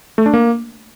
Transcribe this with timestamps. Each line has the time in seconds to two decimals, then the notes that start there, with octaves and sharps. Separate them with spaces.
0.18 A3
0.26 D4
0.34 A#3